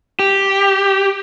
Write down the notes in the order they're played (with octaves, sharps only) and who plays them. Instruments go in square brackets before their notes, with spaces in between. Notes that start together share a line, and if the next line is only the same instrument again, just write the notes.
[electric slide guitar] G4